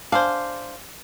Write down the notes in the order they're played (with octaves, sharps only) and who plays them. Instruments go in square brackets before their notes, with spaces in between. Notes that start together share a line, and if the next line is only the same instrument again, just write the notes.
[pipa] D4 G#4 C5 [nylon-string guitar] F5